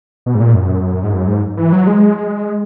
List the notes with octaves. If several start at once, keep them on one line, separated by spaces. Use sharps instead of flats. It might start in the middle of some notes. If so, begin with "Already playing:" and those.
B2
G#2
A#2
F#2
G#2
F#2
G#2
E3
F#3
G#3